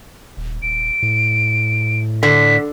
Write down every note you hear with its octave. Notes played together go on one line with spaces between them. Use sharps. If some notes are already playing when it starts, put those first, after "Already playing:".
D#1
D#1 D7
A2
D3 B6